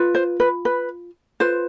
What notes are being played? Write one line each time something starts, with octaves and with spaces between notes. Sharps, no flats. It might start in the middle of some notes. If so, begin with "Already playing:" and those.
Already playing: F4 B4
C5
B4
B4
F4 B4 C5